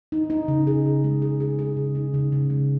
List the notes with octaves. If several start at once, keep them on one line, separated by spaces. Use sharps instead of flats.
D#4
D#4
C#3
G#4
G#4
G#3
G#4
G#4
G#4
C#3
D#4
C#3
C#3
G#3